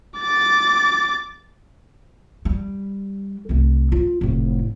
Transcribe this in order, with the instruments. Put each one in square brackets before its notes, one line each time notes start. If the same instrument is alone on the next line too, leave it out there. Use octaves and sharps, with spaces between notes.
[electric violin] D6 A6
[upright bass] G3
C2 A3
F4
F1 A2